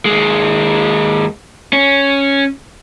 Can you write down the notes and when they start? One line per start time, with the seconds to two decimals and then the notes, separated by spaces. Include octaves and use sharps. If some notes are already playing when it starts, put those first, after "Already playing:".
0.05 D#2 G#3
1.73 C#4